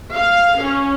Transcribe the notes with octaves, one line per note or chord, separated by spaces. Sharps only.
F5
C#4